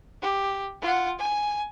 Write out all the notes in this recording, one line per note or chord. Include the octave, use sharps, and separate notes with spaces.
G4
F4 F#5
G#5